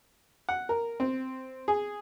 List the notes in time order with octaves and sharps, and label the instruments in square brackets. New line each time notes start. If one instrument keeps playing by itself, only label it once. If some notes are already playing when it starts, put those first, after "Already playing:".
[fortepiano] F#5
A#4
C4
G#4